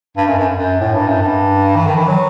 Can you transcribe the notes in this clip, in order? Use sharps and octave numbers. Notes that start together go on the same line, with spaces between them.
G2
F#2
F#2
F#2
A2
G2
F#2
G2
E3
D#3
E3
F#3